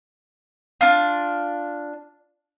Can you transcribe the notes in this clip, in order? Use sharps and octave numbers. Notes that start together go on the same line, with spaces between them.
D4 F4